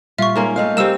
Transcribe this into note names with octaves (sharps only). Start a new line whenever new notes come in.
A#2 G3 F4 E5 C#6
G#2 A#3 C#4
A3 D#4 F5
G3 A#3 C4 G4 E6 E7